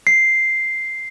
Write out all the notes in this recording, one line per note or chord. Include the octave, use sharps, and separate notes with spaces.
C7